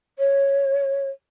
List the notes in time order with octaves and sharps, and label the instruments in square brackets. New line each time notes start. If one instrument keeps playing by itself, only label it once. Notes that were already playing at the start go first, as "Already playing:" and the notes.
[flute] C#5